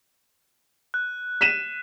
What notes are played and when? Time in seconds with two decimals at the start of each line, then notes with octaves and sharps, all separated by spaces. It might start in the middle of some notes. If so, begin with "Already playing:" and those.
0.94 F#6
1.41 B6 D#7 E7